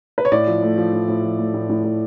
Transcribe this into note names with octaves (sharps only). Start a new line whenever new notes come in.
B4
C#5
A2 D5
F3
A3
F3
A2
A2
F3
A3
A2
A2
A2